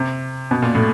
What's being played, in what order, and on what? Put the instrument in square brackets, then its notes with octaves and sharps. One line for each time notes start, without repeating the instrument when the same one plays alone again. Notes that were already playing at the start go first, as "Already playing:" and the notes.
Already playing: [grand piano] C3
B2
A#2
A2